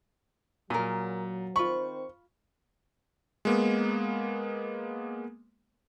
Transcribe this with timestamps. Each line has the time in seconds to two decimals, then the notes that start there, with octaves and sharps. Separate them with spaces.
0.70 A#2 F#3 G#4 A#4
1.56 D#3 C4 F4 C5 B5 C#6
3.45 G#3 A#3 B3